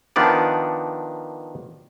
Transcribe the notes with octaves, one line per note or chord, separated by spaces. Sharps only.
D#3 F3 B3 D4 D5